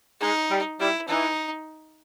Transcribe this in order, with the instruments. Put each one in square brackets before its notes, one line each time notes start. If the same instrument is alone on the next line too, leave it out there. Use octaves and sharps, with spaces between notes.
[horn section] G#3 [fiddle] D#4
[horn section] G3
[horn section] G3 [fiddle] E4
[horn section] E3 [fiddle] D#4